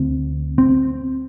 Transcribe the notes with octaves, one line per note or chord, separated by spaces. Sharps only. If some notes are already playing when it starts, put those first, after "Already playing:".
Already playing: D2 D3 C4
C4